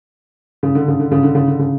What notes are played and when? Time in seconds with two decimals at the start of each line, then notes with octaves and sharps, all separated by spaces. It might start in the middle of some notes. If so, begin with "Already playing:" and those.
0.63 C#3
0.75 D3
0.88 C#3
1.00 D3
1.12 C#3
1.23 D3
1.35 C#3
1.48 D3
1.59 C#3